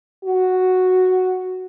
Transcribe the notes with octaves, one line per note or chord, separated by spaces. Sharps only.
F#4